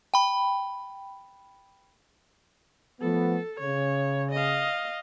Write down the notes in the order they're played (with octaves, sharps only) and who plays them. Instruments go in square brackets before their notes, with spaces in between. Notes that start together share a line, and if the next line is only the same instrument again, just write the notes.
[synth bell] G5 B5
[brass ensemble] F3 A3 B3 [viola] A4
[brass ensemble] C#3 [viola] C#5
[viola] D#5 F5